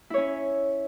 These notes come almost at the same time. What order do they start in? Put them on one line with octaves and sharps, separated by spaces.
E4 C#5 C#4